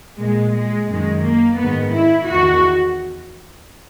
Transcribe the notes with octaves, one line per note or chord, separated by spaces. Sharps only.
A#2 G#3
G#3
F#2 D#3 G#3
A#3
G#2 D#3 B3
E4
E2 D#3 F#4